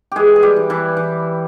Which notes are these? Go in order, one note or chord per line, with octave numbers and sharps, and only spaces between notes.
E3 G#3 G4 G#4
G#4
G3 G4
E3
E3 E4
E3